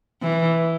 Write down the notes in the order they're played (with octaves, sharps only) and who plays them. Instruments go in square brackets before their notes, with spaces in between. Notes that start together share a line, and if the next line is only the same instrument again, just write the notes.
[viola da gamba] E3